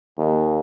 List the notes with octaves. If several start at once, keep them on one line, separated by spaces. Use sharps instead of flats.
D#2